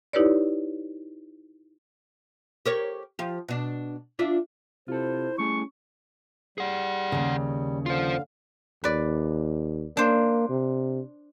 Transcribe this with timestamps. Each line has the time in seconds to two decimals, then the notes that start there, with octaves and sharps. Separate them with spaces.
0.13 D#4 E4 G4 B4 C#5 D5
2.66 G4 A#4 C#5
3.19 F3 G4
3.48 B2 D4
4.19 D4 F4 E5
4.88 C3 E4 F4 A4 C5
5.38 G3 A3 C#4 G#4 C#6
6.58 G3 G#4 F#5
7.12 D#2 C#3
7.86 D3 F4 C5 F5
8.84 D#2 B4 D5
9.97 A#3 D4 C5
10.49 C3